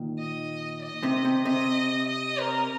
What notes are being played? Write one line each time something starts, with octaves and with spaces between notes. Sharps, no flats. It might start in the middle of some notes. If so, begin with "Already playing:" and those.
Already playing: A#2 D#3
D#5
D#5
C3
C3
C3 D#5
D#5
A#4